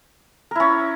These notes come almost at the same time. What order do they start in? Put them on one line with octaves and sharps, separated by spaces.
A#4 E4 C#4